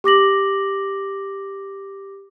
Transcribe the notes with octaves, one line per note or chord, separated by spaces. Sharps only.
G4 D6 A#6 F#7